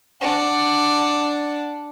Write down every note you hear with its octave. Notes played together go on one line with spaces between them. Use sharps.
D4 F#5